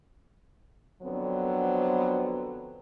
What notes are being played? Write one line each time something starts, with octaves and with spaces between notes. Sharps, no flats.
F2 D3 F#3 B3 C4